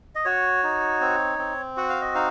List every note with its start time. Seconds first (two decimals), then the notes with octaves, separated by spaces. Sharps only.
0.15 D#5
0.25 F#4 C#5
0.63 D#4
1.01 C4
1.39 C4
1.77 F#4 F#5
1.89 F5
2.02 D#5
2.15 D#4 F5